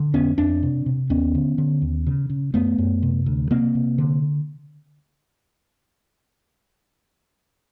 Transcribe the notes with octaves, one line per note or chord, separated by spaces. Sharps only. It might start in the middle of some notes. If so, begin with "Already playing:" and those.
Already playing: D3
F2 B3 C#4
F2 C4 D4
C3
C3
D#2 B3 C#4
D3
D3
D#2
C#3
C#3
F#2 A3 B3
F#2
C3
D2
C3 A#3 C4
C3
D3